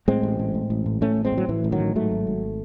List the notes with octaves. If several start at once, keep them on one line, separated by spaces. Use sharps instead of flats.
A2 G#3 C4
A1
A2
A2
A1
A2
A2 A3 C#4
A1
G#3 C4
A2
F#3
A2 E3
A1
D#3 F#3
A2
G#2 F#3 A3
G#1
G#1